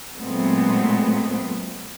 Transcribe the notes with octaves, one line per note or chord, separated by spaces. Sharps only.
A#2 F#3 G#3 A3 B3 C4